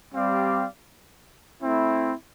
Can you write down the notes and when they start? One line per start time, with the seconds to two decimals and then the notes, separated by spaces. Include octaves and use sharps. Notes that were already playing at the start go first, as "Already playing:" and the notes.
0.14 G3 C4 G4 D5 F5
1.62 A3 C4 E4